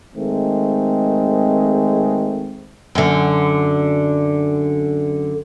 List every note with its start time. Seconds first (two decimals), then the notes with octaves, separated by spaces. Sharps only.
0.16 D#3 G#3 A3 C4
2.95 F#2 D3